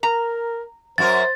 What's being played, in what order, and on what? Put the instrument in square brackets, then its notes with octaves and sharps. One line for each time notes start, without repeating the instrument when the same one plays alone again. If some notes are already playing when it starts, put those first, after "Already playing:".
[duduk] A#4 [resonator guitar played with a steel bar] A#5
[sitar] F#2 F#4 A#4 [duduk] C5 [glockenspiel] A6